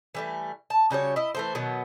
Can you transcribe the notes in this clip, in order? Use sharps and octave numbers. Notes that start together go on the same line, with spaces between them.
E3 G3 A3
A5
C#3 G3 F#4 C#5
E4 D#5
E3 A3 C5
B2 D#3 F#3 B3